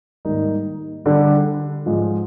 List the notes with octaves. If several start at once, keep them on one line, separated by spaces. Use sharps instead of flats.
G#2 D#3 G3 A#3 D#4
D3 G3 D4
G#2 F3 G#3